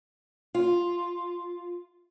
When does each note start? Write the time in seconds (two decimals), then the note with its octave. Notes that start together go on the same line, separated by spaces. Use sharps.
0.55 F4